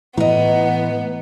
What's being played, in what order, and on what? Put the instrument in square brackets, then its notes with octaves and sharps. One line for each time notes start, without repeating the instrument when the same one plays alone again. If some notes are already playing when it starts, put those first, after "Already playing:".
[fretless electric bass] A2 [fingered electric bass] E3 [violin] B3 [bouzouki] D#5 A#5